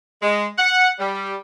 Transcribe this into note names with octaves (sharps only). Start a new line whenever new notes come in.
G#3
F#5
G3